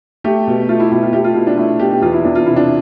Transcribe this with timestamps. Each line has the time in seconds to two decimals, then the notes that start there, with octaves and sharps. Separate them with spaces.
0.24 A3 G4
0.47 B2
0.69 A3 F4
0.80 E4
0.92 B2 E4
1.03 F4
1.13 A3 G4
1.24 F4
1.35 B2 E4
1.47 D4
1.57 A3 E4
1.79 B2 G4
1.91 G4
2.02 E2 F4
2.13 E4
2.24 E2 D4
2.35 F4
2.46 C3 E4
2.56 D4